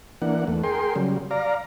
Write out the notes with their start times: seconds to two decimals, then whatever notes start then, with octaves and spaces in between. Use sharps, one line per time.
0.22 E3 A#3 D4 F#5
0.47 E2 A3
0.64 G#4 A#4 G5 C6
0.96 C#3 F#3 G3
1.31 D5 F5 A#5